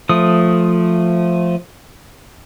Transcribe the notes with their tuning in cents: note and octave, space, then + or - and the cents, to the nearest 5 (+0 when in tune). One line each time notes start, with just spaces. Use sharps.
F3 +0 A3 +0 D#6 +0